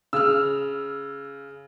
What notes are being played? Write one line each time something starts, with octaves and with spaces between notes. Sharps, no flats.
C#3 E6 F6